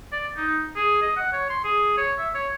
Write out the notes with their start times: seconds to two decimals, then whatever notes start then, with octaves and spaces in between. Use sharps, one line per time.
0.12 D5
0.37 D#4
0.76 G#4
1.02 D#5
1.17 F#5
1.33 C#5
1.50 C6
1.64 G#4
1.97 C#5
2.18 E5
2.35 C#5